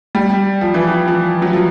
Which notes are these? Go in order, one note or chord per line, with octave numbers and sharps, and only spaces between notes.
G3
F3
E3
F3
F3
F#3
F3